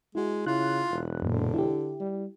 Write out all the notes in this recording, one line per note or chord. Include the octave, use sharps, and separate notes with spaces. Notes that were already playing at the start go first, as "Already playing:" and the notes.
G#3 E4 F#4
C#3 E4 F4 F#6
E1
F#2 A#2 D3
E4 G4
G3